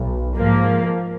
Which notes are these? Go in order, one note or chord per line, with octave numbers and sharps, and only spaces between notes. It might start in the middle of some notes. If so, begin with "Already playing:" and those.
Already playing: B1
G#2 F3 A#3